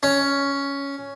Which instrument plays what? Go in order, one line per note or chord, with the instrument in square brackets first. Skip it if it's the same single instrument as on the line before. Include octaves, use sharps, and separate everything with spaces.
[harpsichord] C#4